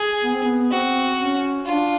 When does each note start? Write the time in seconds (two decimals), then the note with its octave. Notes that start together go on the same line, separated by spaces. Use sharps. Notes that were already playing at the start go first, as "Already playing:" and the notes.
Already playing: G#4
0.24 B3
0.34 C4
0.44 B3
0.71 C4 F#4
1.18 C#4
1.66 D4 F4